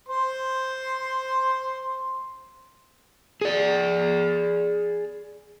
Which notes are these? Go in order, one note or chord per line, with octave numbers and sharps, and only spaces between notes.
C5 C6
G#4 D5